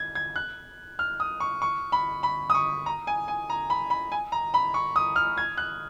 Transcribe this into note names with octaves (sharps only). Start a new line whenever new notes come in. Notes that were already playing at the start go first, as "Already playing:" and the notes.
Already playing: G#6
G#6
F#6
F6
D#6
C#6
C#6
B5
B5
D#6
C#6
A#5
G#5
G#5
A#5
B5
B5
G#5
A#5
B5
C#6
D#6
F6
G#6
F#6